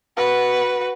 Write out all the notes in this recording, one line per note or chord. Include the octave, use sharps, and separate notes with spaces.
F#4 B4